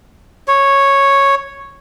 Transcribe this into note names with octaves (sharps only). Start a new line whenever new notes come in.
C#5